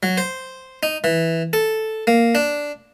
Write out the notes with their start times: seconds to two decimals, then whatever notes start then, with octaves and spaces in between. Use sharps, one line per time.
0.03 F#3
0.18 C5
0.83 D#4
1.04 E3
1.53 A4
2.07 A#3
2.35 D4